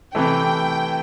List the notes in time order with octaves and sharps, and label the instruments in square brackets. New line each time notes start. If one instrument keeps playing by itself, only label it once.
[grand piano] C3 E3 A3 [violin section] G5